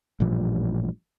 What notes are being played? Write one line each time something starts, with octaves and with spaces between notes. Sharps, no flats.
A1 G2 A#2 F3